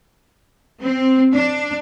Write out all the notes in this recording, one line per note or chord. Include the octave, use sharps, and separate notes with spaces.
C4
D4